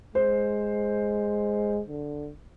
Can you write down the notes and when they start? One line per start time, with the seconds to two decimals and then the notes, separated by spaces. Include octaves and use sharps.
0.15 G#3 C5
1.88 D3